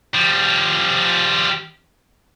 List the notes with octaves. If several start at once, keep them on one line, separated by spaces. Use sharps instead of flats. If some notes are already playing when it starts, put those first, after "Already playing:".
F3 G3